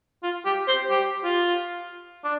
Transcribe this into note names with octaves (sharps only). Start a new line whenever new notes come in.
F4
G4
C5
G4
F4
D4